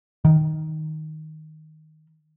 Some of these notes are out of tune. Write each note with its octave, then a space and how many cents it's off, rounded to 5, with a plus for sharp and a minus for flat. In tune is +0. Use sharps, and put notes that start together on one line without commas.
D#3 +5